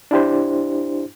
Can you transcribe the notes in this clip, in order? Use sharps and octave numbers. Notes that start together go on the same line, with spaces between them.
D4 E4 G4 C5